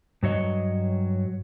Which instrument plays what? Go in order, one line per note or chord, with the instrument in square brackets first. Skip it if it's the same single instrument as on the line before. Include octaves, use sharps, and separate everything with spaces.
[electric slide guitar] G2 F#3 C#5 D#5